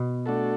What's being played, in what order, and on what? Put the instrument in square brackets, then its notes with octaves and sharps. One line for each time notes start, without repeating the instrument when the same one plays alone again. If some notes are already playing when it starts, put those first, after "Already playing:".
Already playing: [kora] B2
[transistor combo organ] A3 D4 F#4 A4